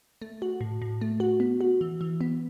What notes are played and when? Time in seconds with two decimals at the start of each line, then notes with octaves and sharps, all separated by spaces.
0.22 A3
0.42 F#4
0.61 A2
0.82 A2
1.01 A3
1.20 F#4
1.40 B3
1.61 F#4
1.81 E3
2.01 E3
2.21 B3